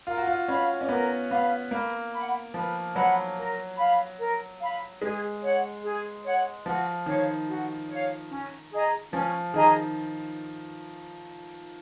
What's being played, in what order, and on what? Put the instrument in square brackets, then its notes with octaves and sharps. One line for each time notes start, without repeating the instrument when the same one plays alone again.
[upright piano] F4 [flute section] A#4
[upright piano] F#4
F4
[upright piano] C#4 [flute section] F5 B5
[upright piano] C#4
[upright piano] B3 [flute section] A#4
[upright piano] B3 [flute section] F5 B5
[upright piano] A#3 [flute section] B4
[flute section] F#5 B5
[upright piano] F3 [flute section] B4
[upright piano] F#3 [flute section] F#5 B5
[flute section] A#4
F5 B5
A#4
F5 B5
[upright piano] G#3 [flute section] G#4
[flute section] C#5 F#5
G#4
C#5 F#5
[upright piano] F3 [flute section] F#4
[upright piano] D#3 [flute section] C#5 F5
[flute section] F#4
C#5 F5
C#4
G#4 D#5 A#5
[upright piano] F3 [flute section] C#4
[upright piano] D#3 [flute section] G#4 D#5 A#5